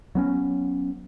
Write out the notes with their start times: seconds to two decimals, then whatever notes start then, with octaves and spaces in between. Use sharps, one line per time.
0.15 F#3 B3 C#4